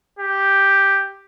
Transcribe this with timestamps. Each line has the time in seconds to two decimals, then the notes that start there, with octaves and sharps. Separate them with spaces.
0.19 G4